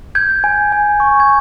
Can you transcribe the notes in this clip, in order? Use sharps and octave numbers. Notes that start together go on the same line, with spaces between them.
G6 G#6
G#5
G#5
C#6
G#6